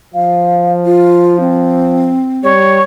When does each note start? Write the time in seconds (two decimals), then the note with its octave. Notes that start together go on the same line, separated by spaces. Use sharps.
0.14 F3 F5
0.85 F4
1.40 C4
2.44 G3 C#5